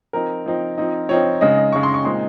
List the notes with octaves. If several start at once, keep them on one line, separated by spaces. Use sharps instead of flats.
F3 C4 D#4 A#4
F3 C4 D#4
F3 C4 D#4
F3 C4 D#4 C#5
C#3 G#3 D#4 D#5
D#5
C#3 G#3 D#4 C#6
C6
C#6
A#2 G#3 C4 D#4 C6